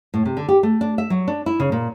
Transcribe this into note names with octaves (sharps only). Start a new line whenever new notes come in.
A2
C3
D3
G4
A3
D4
E5
F#3
D4
E4
C#3
A#2